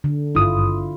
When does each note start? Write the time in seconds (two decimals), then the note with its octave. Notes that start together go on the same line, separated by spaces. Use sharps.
0.04 D3
0.35 G#1 G2 E4 F4 D#6